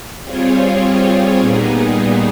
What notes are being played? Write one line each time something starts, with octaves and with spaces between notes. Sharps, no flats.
G3 C4 F4 G#4 C#5
A#2 G3 B3 D#4 G#4